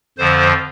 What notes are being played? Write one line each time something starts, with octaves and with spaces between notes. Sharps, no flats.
F2 D3 F3 C5